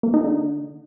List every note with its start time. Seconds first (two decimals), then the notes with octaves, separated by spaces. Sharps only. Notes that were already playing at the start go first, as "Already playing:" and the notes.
0.03 A#3
0.14 D#4
0.24 D3